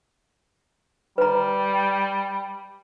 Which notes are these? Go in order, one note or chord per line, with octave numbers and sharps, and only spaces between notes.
G3 B4 A#5